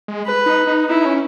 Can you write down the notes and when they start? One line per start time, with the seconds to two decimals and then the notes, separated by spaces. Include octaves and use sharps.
0.08 G#3
0.25 B4
0.46 D#4
0.67 D#4
0.89 D#4 E4
1.05 C#4